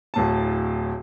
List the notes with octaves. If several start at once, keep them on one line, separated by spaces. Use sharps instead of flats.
D1 A2 A5